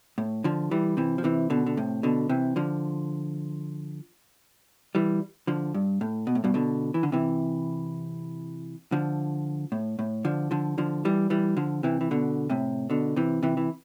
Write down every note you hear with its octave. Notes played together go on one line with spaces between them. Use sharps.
A2
D3 F3
E3 G3
C3 E3
F3
C3 E3
B2 D3
D3
A2 C3
B2 D3
C3 E3
D3 F3
E3 G3
D3 F3
G2
A2
B2
A2
G2 B2
B2 D3
E3
D3
C3 E3
D3 F3
A2
A2
D3 F3
D3 F3
D3 F3
E3 G3
E3 G3
D3 F3
C3 E3
E3
B2 D3
A2 C3
B2 D3
C3 E3
C3 E3
E3